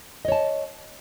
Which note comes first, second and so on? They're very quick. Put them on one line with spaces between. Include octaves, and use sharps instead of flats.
D#5 C#5 A5